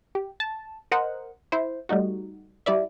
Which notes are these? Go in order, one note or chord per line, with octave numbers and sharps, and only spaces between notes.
G4
A5
A#4 C5 D#5 F#5
E4 C5
G3 A3 D#4 F#4
G3 E4 D5 E5